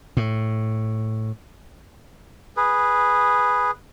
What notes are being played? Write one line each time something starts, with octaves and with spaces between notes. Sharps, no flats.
A2
G#4 B4